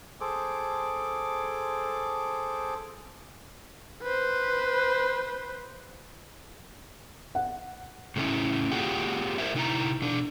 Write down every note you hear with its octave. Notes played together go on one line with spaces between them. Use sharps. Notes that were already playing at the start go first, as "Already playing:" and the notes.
G#4 A4 C5 D6
B4 C5
F#5
A2 C#3 A3 B3 C#4 E4
A#3 F4 G4 G#4 F#5 G5
A#4 C5 E5
C3 D#4 E4 A#5
B2 D4